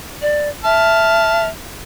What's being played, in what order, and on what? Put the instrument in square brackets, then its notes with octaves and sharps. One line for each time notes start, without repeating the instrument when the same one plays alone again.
[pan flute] D5
[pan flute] E5 [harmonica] A5 F6